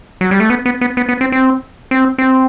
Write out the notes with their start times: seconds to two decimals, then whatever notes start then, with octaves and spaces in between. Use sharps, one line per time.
0.21 F#3
0.31 G3
0.40 A3
0.50 B3
0.65 B3
0.81 B3
0.97 B3
1.09 B3
1.21 C4
1.32 C4
1.91 C4
2.18 C4